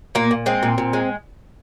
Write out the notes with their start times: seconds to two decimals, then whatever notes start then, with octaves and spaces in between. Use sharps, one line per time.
0.15 A#2 A#3
0.31 A#2
0.46 G#3 C4
0.63 A#2
0.78 A#2
0.93 G#3